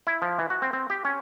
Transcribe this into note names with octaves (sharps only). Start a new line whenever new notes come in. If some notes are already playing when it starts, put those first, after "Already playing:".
E4
F3
E3
F#4
C4
C4
G4
C#4